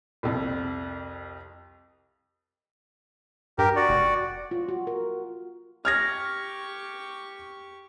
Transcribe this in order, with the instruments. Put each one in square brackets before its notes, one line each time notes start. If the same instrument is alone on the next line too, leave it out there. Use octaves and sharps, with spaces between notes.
[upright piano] C2 F2
[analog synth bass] G2 [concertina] G4 A#4
[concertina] F#4 D5
[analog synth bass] F1
[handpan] F4
F#4
A#4
[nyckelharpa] G4 C#6 [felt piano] F6 G#6 A#6